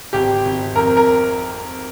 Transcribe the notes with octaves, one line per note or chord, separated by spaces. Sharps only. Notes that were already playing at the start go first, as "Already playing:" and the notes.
G#1 G4
G#1
F2 A#4
A#4